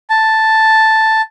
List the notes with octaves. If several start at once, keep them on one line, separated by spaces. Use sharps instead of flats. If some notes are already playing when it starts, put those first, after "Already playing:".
A5